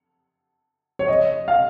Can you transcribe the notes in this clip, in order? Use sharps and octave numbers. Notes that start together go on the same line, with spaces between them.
C#5
D#5
F5